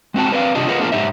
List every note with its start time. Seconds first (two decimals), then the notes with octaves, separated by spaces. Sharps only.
0.14 G#3 C4 F#4 A5
0.31 C4 B4 C#5 D5 F5
0.55 C3 D4 F4 G4 D#5
0.67 F4 G#4 A#4 B4 D#5 F#5
0.79 A#3 B3 D4 F4 G#4 A#4
0.92 G#2 D#3 D#4 G4 C5 E5